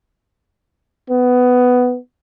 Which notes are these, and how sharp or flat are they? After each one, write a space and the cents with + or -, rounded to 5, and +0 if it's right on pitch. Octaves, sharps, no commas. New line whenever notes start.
B3 +10